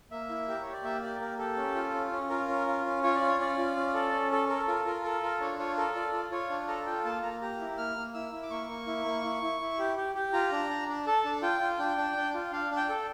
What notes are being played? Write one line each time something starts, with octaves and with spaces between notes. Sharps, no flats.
A#3 E5
E4
G4 A#4
G4 C#5
D5
A#3 E5
G4 D5
A#3 A#4
G4 A4
C#4
F4
C#4
C#4
F4 A#4
C#4
F4
C#4
F4 C#5
D5
F4
C#5
C#4 D5
F4
C#4
A4
C#4
A4
A4 A#4
F4 A#4
F4 A#4
A4 A#4
F4 A#4
D4 C#5
F4 C#5
A4 A#4
F4 D5
F4
F4 C#5
D4
A4 A#5
F4 G5
A#3 A5
A#3 A#5
G4 A#5
E4
A#3 F6
A#3
E4 E6
E4
D6
A#3 C#6
A#3
E4
A#3
E4
E4
E4
G4
G4
G4
F4 A#5
D4
D4
D4
A4 A5
D4
F4 G5
F4
D4 G5
D4
D4
F4
D4 F5
D4
G5
A4